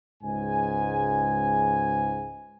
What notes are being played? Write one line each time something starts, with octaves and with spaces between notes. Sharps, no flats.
C#2 G#2 G#5